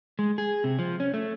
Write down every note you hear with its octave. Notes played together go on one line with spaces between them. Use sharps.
G#3
G#4
C3
F3
C#4
A3